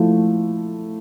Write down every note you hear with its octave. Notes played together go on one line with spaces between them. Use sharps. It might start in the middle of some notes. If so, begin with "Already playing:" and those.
Already playing: F3 A3 E4